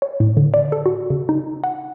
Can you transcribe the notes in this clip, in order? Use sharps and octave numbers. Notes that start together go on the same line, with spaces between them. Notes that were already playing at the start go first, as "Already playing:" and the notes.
C#5
A2
D3
D5
A4
F#4
C#3
D#4
F#5